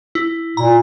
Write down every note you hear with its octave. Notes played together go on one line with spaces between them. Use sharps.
E4
A#2 A#5